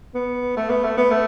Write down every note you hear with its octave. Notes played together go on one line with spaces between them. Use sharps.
B3
A3
B3
A3
B3
A3